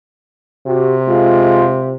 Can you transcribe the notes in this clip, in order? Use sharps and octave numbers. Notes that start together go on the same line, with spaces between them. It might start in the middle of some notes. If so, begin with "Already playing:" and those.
C3 F#4 G4
G#3 F4